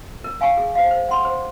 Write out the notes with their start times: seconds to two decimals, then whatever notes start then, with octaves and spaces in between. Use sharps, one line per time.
0.24 A#4
0.41 F5 G#5 C#6
0.57 G#4
0.75 C5 F5
0.91 C5
1.09 F#5 C6
1.25 C5